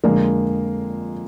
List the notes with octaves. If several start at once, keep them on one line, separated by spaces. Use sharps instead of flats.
F2 D3 G#3 A#3